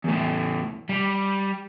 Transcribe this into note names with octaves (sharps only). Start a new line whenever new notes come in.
E2 A2
G3